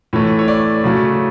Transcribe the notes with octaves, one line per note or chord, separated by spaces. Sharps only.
A2 E3 A3 C#5
C#5
D5
C#3 F#3 A3